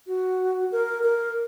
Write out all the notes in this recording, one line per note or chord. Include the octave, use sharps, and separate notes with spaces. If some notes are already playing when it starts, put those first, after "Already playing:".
F#4
A#4
A#4